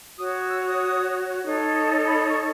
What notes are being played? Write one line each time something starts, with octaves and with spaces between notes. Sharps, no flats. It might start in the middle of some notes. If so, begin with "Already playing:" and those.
F#4 C#5 D#6
D#6
E6
D#6
D#4 A4 C#5
B5
C#6